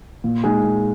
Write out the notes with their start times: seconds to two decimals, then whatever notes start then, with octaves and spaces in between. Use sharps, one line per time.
0.24 A#2
0.44 G#3 D#4 G#4
0.63 A#2